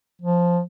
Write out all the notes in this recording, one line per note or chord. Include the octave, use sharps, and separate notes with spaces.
F3